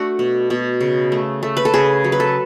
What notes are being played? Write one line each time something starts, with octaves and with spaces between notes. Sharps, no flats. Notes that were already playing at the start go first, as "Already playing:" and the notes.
Already playing: A3 D4 F#4
B2
B2
C#3
A3
A3
B4
A4
C#3 G#4
F#3
B4
A4